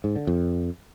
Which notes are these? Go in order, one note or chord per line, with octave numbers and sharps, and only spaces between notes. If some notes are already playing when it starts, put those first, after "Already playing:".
G#2
D3
F2